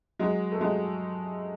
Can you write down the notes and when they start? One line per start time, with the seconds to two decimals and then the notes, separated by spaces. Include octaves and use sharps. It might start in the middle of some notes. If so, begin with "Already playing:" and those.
0.19 F#3 G#3
0.52 A3
0.61 F#3 G#3